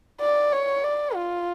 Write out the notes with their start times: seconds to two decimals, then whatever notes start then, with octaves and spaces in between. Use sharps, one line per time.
0.21 D5
0.52 C#5
0.84 D5
1.15 F4